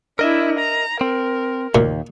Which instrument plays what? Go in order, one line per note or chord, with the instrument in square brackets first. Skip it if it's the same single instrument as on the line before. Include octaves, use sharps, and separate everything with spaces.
[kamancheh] D4 E4 [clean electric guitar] A#4 D#5 E5
[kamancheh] A#5
[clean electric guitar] C4 [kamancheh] A#4
[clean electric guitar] D#2 [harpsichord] A#2